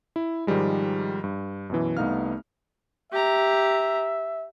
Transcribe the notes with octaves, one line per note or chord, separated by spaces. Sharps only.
E4
G#2 D#3 F3 G3 G#3
G2
F#2 B2 E3
C2 A3 B3 D#4 F5 F6
G4 E5 A#5